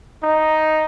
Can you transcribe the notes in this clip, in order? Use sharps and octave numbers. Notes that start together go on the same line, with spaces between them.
D#4